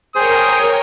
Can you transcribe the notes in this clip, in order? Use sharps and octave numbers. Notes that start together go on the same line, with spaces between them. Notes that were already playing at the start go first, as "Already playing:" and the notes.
G#4 A#4 C5 C#5 G5 D#6